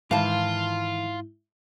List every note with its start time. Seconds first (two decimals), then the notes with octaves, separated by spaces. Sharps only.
0.11 G#2 D#3 E3 E4 F4 F5 A5